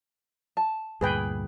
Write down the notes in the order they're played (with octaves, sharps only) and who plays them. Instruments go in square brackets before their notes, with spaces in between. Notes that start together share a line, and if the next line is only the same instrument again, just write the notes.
[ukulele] A5
[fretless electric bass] D2 G2 A#2 [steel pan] G#4 B4 G5